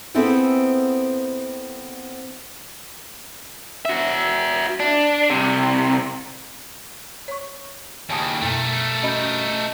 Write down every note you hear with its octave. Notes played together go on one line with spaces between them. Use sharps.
B3 C4 E4 G#4 A4 B4
F#4 E5
D4
C2 C3
C#5 C#6
D#2 C#3 G#5 A5 D#6
F#2 B2 A3 A#4
C#4 F#4 D#5 B5 G6